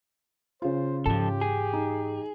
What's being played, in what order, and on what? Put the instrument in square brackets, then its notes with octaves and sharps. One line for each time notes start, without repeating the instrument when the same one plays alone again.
[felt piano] C#3 F4 [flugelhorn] C5
[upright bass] G#2 E3 [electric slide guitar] F3 A4 [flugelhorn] G4
[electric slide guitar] G#4
[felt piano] D#4